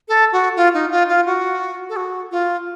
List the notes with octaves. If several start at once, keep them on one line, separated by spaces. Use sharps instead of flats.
A4
F#4
F4
D#4
F4
F4
F#4
A4
F#4
F4